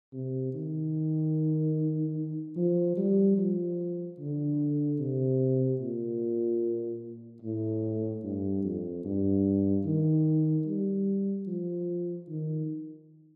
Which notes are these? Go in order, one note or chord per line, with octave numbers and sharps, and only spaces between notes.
C3
D#3
F3
G3
F3
D3
C3
A#2
A2
G2
F2
G2
D#3
G3
F3
D#3